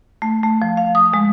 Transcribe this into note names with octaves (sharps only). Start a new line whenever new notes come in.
A3
A3
F3
F5
D#6
G#3